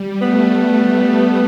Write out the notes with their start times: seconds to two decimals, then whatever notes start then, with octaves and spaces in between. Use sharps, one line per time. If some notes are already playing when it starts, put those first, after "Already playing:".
Already playing: G3
0.21 A3 B3